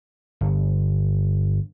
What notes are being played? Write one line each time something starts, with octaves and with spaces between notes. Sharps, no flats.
G1